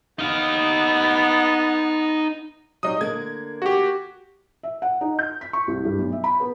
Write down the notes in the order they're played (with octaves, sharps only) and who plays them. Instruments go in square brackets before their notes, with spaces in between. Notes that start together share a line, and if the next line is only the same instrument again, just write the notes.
[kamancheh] B3 [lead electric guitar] D#4 F5
[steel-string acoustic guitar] F#3 G3 D#4 [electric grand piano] D#5 D#6
[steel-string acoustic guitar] D3 A#3 [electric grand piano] G#6
[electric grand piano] F#4 G4
[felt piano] E5
F#5
D#4
G6
B6
C#6
C2
G2
B1
E5
B5
B3